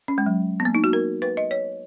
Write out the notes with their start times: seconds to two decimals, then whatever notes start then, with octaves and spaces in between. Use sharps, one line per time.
0.08 C#4
0.18 G#3
0.26 F#3
0.60 B3
0.65 A#3
0.75 D#4
0.84 F#4
0.93 A#4
1.22 B4
1.37 D#5
1.51 C#5